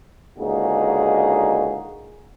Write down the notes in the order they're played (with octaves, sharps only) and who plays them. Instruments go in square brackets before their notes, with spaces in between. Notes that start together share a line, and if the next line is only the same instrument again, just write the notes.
[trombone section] C#2 D3 A#3 D#4 F#4 G#4